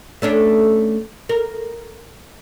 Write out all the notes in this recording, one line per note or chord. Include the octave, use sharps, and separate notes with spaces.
A3 C#4 D4
A#4